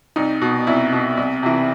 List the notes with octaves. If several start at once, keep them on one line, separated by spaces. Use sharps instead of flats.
C2 D#4
B2
C2 E4
B2
C2
C3 E3